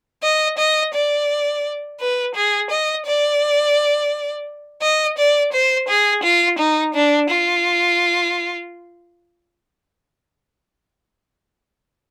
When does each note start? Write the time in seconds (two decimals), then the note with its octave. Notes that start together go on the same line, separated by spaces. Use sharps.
0.23 D#5
0.58 D#5
0.94 D5
2.00 B4
2.35 G#4
2.70 D#5
3.06 D5
4.82 D#5
5.18 D5
5.53 C5
5.88 G#4
6.23 F4
6.59 D#4
6.95 D4
7.30 F4